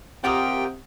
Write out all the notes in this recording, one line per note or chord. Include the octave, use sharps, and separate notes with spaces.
C3 F4 G4 A#4 F#5 G5 D#6